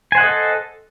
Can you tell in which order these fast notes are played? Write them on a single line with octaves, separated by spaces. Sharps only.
G#5 C5 F#5 D#5 A4